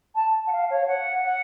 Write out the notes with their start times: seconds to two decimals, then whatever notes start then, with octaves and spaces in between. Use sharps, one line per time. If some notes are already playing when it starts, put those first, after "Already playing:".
0.15 A5
0.47 F#5
0.52 F5
0.70 C#5
0.87 F#5
1.25 F#5